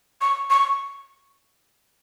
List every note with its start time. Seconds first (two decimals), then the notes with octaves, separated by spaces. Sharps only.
0.21 C#6
0.50 C#6